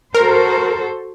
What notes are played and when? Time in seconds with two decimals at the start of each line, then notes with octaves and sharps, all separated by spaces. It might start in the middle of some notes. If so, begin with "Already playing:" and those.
0.14 F#4 A4 A#4 C5